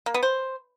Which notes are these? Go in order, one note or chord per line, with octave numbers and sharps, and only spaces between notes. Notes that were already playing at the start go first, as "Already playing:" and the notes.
A#3
B3
C5